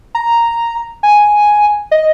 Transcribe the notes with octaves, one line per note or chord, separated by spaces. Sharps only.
A#5
G#5
D#5